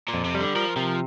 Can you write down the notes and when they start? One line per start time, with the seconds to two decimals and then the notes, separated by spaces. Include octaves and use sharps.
0.08 A#2
0.14 F2
0.24 C3
0.35 G3
0.40 D3
0.56 F3 A#4
0.76 C3 F3